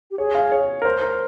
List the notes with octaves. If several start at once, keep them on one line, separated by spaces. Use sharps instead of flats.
G4
G#4 C#5
F5
C#5
A#4
C5
A#4